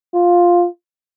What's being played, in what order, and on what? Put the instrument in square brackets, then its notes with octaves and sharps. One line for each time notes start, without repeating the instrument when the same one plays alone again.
[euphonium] F4